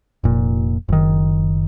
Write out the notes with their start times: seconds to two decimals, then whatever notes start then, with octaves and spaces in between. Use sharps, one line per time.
0.24 F1 A#2
0.89 F#1 D#3